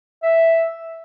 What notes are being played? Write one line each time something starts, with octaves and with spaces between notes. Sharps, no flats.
E5